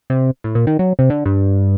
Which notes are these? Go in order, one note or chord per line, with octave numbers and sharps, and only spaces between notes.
C3
A2
A#2
D#3
F#3
C3
D3
G2